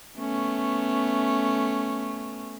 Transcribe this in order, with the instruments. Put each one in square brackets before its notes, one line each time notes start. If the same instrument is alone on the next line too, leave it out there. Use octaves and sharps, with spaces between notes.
[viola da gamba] A3 B3 C#4